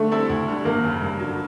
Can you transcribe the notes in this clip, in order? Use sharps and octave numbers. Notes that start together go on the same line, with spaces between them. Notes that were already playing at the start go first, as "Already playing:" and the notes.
Already playing: D3 A3
G3 C4 E4 A4
D2
D3 G3
G#1 A#3
F#2 C#3
G2
D3 F#3